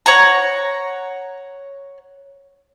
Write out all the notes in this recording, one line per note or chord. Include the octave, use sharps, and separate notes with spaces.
C#5 F#5 A#5